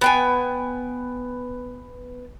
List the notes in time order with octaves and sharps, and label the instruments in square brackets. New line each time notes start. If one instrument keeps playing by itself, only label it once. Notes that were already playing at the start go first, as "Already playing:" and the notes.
[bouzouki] B3 G5 G#5